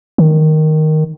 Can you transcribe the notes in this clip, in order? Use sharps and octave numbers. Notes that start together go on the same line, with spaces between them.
D#3